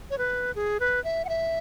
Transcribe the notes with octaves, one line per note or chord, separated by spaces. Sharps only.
C#5
B4
G#4
B4
E5
F#5
E5